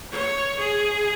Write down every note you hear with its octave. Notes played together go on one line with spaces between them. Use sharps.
C#5
G#4